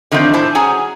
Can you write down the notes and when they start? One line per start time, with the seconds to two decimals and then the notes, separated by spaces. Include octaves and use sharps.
0.12 D3 D#3 F3 A3 C4
0.33 A2 E4 C5 A5
0.55 F#3 C#4 G#4 G#5 A#5